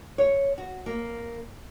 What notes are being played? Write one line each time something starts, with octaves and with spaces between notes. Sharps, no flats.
C#5
F#4
A#3